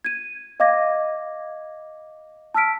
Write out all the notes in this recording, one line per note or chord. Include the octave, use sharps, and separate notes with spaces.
G#6 D#7
D#5 F5 D6 G#6 A#6
A5 E6 F6 B6 D7